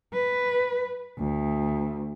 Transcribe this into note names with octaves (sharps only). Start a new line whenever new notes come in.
B4
D2